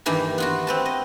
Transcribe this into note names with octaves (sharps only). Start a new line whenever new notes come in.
G2 D#3 E3 A#3 B5
B3 F4 F#4
C4 B4 A5
D#5